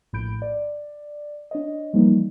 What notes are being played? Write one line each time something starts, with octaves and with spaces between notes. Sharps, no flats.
A#1 A2 B5 G6 D7
D5
D4 C#5 D#5
E3 F3 G3 A#3 D#4